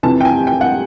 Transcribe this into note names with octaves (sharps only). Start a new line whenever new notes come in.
F2 C3 E3 A5
G5
G#5
G5
F#5